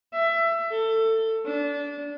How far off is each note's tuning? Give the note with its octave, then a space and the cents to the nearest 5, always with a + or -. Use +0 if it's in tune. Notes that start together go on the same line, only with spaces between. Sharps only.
E5 +20
A4 +20
D4 -25